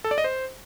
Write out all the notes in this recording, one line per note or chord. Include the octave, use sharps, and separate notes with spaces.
A4
D5
D#5
C5